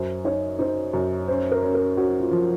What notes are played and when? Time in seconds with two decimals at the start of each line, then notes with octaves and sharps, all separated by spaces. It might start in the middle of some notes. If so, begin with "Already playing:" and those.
Already playing: F#2 C5
0.25 D#4 C#5
0.59 D#4 C5
0.93 F#2
1.28 C#4 C5
1.51 A#4
1.63 C#4
1.74 A#4
1.97 C#4 F#4
2.20 F4
2.31 F3